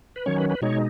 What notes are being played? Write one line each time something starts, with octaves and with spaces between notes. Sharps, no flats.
B4
D#3 F#3 C#4 C#5
B4
B4
B2 G#3 D#4 C#5